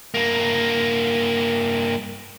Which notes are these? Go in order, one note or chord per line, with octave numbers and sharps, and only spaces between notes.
G2 A#3